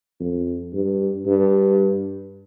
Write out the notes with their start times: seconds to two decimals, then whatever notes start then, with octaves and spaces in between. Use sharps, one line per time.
0.20 F2
0.73 G2
1.26 G2